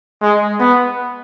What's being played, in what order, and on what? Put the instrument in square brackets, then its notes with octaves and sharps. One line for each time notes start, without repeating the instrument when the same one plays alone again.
[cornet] G#3
B3